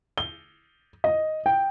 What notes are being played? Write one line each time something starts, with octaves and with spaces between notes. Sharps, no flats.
G7
D#5
G5